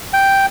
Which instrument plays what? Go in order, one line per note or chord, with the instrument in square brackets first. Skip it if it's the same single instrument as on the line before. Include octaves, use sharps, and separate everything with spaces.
[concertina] G5